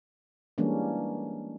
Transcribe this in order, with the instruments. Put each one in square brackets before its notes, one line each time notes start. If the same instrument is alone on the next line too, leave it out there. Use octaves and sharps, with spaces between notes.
[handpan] E3 G3 G#3 A#3 C#4 D4